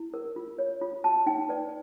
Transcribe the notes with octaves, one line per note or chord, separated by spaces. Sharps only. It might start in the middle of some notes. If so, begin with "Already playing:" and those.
Already playing: E4
A#4
F4
C#5
F4
F#4 A5
D#4 G5
B4 D5